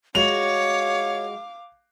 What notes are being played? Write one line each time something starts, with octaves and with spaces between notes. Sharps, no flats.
G#3 F4 F#4 C#5 F5 D6 F7